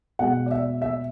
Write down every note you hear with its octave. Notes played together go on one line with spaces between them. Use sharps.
B2 G#3 F#5
D5
E5
E5